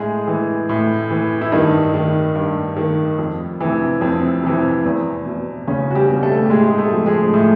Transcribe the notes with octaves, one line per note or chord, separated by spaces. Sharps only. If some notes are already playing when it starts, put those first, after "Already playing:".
Already playing: A2 G#3 G#4
E3
A2
E3
E4
G2 D#3 D#4
D#3
G2
D#3
F2
C3 E3
F2 C4
C3 E3
E2
B2
E2 C#3 C#4
F#4
G3 G4
B2
A3 A4
G4
A2 G#3 G#4
G4
G#4
A3 A4
F3
G#3 G#4
A2